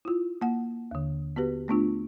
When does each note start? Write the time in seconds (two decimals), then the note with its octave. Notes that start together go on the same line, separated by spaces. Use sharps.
0.05 E4 F4
0.41 A#3 F#5
0.91 D#2 D3
1.36 B3 F#4 G4 B4
1.68 A3 B3 D4 F4